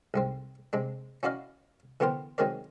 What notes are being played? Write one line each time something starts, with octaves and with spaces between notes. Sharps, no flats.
C2 G#2 C4
C3 G#3 D4
C#4 E4 F#4 D5 D#5 F5
D3 E3 B3 G4 A#4 C5
D#3 F#3 G#3 C4 A#4 D5